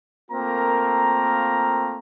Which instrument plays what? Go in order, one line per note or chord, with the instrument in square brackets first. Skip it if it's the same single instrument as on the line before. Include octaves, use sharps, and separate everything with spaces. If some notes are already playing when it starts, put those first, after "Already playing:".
[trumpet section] A3 A#3 C4 F4 A#4 A#5